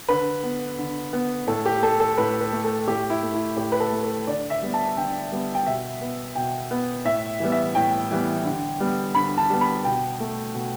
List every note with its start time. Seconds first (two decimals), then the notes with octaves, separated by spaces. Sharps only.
0.09 D3 B4
0.43 B3
0.79 D3
1.13 B3
1.47 A2 A4
1.66 G4
1.82 A3 A4
2.00 A4
2.18 A2 B4
2.41 B4
2.52 A3
2.64 A4
2.87 A2 G4
3.10 E4
3.23 A3
3.34 E4
3.57 A2 G4
3.72 B4
3.80 A4
3.92 A3
4.04 A4
4.27 D3 D5
4.50 E5
4.62 G3 B3
4.74 A5
4.97 D3 G5
5.32 G3 B3
5.55 G5
5.66 B2 E5
6.01 B3
6.35 B2 G5
6.71 B3
7.05 A2 E5
7.40 E3 G3 B3
7.52 E5
7.75 A2 G5
8.11 E3 G3 B3
8.45 D3
8.80 G3 B3
9.15 D3 B5
9.38 A5
9.50 G3 B3
9.61 B5
9.84 B2 G5
10.20 A3
10.54 B2